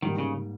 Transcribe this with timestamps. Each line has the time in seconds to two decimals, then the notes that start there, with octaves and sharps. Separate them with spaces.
0.02 G#2 D#3 G3 A#3
0.18 C#3